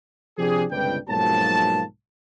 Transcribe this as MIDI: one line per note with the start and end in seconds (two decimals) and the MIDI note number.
0.38 0.65 48
0.38 0.65 53
0.38 0.65 62
0.38 0.65 67
0.38 0.65 68
0.71 0.97 31
0.71 0.97 37
0.71 0.97 48
0.71 0.97 62
0.71 0.97 71
0.71 0.97 79
1.09 1.83 35
1.09 1.83 44
1.09 1.83 53
1.09 1.83 54
1.09 1.83 58
1.09 1.83 81